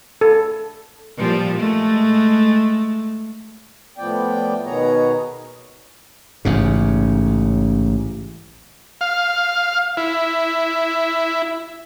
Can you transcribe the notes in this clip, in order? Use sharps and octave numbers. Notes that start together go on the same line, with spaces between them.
A4
A#2 F3 G3
G#3 A3
A2 F3 B3 D5 G5
B2 D#3 B3 G#4 C#5 A#5
A1 G#2 C#3
F5
E4